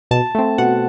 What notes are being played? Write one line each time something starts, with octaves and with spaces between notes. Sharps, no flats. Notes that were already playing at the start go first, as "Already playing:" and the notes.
B2 A5
A3 C4
B2 F#5